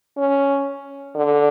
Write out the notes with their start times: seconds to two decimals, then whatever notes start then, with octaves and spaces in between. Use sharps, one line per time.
0.17 C#4
1.15 D3